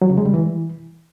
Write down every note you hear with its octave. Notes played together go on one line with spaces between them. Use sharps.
F#3
C#3
G#3
G3
E3